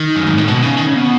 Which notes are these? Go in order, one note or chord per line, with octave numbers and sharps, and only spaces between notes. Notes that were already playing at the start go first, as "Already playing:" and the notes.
Already playing: D#3
F#2
G#2
A2
B2
C#3
D#3
C#3
B2